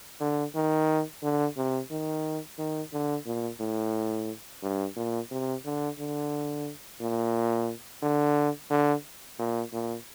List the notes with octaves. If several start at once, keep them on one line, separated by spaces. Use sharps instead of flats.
D3
D#3
D3
C3
D#3
D#3
D3
A#2
A2
G2
A#2
C3
D3
D3
A#2
D3
D3
A#2
A#2